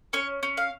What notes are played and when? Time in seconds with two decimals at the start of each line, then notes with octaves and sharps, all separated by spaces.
0.13 C#4 C#5
0.43 C#4
0.57 F5